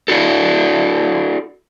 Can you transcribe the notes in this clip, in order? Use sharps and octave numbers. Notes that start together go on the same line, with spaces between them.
D4 E4 F#4 A4